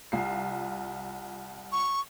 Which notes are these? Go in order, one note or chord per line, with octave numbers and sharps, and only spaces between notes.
C2 F4 C7
C#6